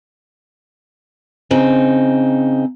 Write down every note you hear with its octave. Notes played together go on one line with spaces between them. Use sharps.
C#3 C4 D#4